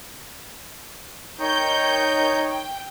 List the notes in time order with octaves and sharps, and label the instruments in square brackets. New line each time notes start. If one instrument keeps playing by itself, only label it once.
[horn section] D#4 C#5 [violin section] A#4 G5 G6
[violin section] G5